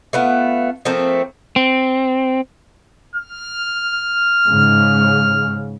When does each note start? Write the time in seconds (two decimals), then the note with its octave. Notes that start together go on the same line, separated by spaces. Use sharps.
0.13 A3 B3 F4
0.85 F3 A3 A#3 C4
1.56 C4
3.16 F6
4.48 G#2 C#3